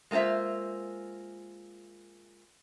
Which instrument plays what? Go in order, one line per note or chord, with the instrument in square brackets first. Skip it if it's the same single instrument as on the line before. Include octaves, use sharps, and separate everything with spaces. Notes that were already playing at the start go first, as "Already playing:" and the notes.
[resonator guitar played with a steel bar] G#3 A#3 F4 C5 E5